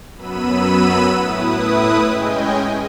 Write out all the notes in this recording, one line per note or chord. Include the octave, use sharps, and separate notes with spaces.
F#2 F#3 B3 B5 E6 D#7
A2 E4 B4 D#6
G#3 C#4 D#5 G5 G#5